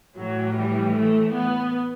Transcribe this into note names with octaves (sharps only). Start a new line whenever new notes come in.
A2 E3 F#3
G3
A3
B3